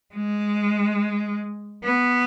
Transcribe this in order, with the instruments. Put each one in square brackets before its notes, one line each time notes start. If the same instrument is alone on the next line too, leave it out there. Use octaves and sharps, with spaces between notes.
[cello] G#3
B3